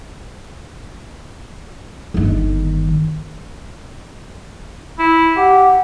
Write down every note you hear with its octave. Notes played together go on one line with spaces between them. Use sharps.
G1 D#3
E4
G4 F#5